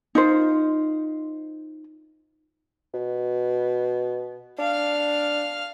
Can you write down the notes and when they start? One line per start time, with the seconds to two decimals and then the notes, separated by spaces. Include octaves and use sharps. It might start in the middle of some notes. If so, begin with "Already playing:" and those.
0.15 D#4 F4 C5
2.94 B2
4.59 D4 F5 F6